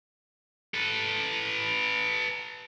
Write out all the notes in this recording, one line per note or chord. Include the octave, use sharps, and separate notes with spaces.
A4 B4